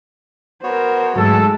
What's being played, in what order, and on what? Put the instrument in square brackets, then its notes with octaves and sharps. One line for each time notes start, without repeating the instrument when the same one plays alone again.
[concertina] B3 F#4 C#5 [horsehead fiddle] A#4 C5
[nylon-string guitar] G#2 E3 F#3 [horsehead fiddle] G#3 A3 [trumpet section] A4